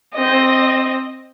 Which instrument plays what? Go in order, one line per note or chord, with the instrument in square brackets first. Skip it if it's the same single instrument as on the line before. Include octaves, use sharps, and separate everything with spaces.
[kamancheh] C4 D#5